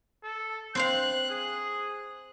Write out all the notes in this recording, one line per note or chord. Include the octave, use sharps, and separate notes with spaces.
A4
C4 C5 F5 F#6
G#4